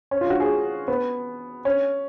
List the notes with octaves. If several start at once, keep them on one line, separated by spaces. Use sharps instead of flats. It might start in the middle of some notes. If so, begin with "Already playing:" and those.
C#4
F4
F#4
G#4
B3
C#4